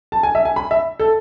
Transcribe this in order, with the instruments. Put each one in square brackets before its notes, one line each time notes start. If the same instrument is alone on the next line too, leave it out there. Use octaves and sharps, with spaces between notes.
[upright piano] A5
G#5
E5
G#5
B5
E5
A4